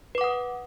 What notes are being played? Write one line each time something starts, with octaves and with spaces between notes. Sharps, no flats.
B4 F#5 D6 D#6